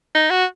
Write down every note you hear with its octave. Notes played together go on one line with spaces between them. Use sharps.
D#4
F#4